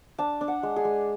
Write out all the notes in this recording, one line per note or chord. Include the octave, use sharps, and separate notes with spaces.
D4 A5
D4
F#5
G#3
G#4
G#3